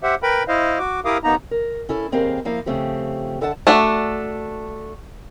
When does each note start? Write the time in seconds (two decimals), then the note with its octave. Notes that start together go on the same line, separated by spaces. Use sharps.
0.03 G4 C5 E5 F#5
0.23 A#4 B4 G5 B5
0.48 E4 C5 D#5 F5
0.79 F#4 D6
1.05 E4 G4 A#4 F5 D6 D#6
1.24 D#2 A#3 B3 D#4 A#5
1.51 A#4
1.89 C#4 E4 A4
2.12 D#2 C4 G4 G#4 A#4 F5
2.45 F3 A#3 E4 F5
2.66 C#3 F3 A3 C4 G4
3.41 D3 A4 E5 F#5 G#5 A5
3.67 A3 D4 F#4